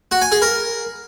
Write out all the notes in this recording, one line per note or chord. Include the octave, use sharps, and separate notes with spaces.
F#4
G#5
G#4
A#4